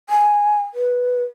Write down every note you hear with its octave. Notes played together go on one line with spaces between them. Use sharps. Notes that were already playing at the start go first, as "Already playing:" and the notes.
G#5
B4